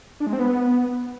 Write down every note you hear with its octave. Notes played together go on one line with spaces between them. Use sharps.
D4
G#3
C4
B3